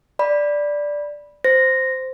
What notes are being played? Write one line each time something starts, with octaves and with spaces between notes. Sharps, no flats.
D5 B5
C5 A#6